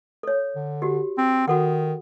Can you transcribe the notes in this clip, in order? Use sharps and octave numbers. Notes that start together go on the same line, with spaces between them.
A4 C#5
D3
F#4 G4
C4
D#3 F#4 A4 F#5